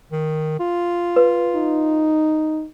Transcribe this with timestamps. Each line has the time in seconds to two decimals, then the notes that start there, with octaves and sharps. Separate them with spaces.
0.12 D#3
0.60 F4
1.16 B4
1.56 D#4